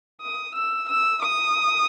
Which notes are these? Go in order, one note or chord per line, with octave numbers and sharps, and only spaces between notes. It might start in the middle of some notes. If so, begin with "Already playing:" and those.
D#6
E6
E6
D#6